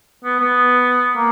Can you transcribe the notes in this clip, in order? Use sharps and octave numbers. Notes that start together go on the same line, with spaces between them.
B3
B3
A#3